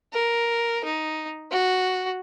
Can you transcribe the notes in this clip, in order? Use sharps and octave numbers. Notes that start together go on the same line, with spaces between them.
A#4
D#4
F#4